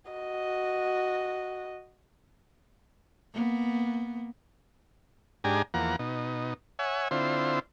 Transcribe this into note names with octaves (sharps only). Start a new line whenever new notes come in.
F#4 D#5
A#3 B3
G#2 D4 G4 G#5 A#5
E2 F3 A#3 F#5 A#5
B2 D#4
C#5 E5 F#5 G#5
D3 C4 E4 F4 C5